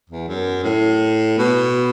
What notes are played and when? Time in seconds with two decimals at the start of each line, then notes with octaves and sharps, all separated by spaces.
0.10 E2
0.28 F#2
0.64 A2
1.38 B2